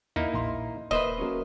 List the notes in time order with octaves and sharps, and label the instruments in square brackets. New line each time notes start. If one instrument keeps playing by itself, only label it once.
[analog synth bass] E2 [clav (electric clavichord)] A#3 D#4 E4
[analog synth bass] A#1 [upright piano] A#5 C6
[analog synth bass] D#1 [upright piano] A#3 [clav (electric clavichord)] B4 C5 E5 [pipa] D#5
[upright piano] F#3 A#3 C#4